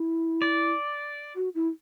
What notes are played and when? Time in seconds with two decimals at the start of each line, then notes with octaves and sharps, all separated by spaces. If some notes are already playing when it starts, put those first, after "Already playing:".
Already playing: E4
0.42 D5
1.36 F#4
1.55 E4